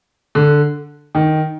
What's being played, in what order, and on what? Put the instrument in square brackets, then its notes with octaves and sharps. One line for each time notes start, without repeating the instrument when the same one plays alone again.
[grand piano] D3
D#3